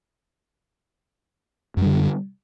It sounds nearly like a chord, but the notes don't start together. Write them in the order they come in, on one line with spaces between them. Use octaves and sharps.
F#2 G3 D3